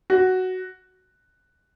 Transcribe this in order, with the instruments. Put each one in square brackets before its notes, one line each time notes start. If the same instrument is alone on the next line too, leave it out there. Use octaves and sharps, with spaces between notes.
[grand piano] F#4